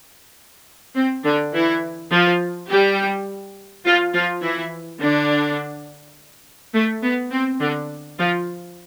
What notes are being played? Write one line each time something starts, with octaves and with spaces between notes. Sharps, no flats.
C4
D3 D4
E3 E4
F3 F4
G3 G4
F3 F4
F3 F4
E3 E4
D3 D4
A3
B3
C4
D3 D4
F3 F4